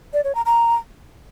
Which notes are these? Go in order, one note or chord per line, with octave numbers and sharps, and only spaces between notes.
D5
C#5
A#5
A#5